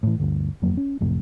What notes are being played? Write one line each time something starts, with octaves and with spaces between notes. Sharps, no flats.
A2 E3
G1 D2 G2
G1 F2 F#3 A#3
C#4
A1 F2 A2 C3